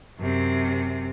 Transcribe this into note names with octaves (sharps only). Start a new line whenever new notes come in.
F#2 C3